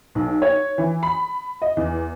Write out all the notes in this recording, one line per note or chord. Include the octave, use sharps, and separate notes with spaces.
B1
C#5
E3
B5
D#5
E2